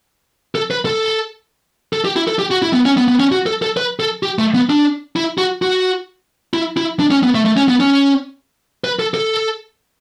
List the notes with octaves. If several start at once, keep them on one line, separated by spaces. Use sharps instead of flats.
A4
B4
A4
A4
G4
E4
A4
G4
F#4
E4
B3
C#4
B3
B3
C#4
F#4
A4
A4
B4
A4
G4
A3
B3
D4
E4
F#4
F#4
E4
E4
D4
C#4
B3
A3
A3
C#4
B3
C#4
B4
A4
A4